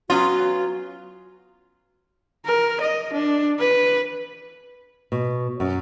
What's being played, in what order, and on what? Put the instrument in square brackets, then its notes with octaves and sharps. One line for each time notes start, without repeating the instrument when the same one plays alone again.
[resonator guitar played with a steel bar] F#3 B3 C#4 [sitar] F4 [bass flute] F#4
[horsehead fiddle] A#4
D#5
D4
B4
[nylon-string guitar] B2
F#2